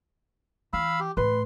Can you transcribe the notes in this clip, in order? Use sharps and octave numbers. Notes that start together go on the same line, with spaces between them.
E3 F5 B5 E6
G4
A2 B4 C6